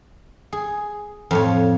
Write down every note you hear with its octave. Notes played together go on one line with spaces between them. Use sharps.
G#4
F2 A2 C#5